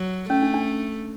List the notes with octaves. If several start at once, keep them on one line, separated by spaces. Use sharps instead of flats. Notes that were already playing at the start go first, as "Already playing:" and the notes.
Already playing: F#3
A3 C#4
D4
D4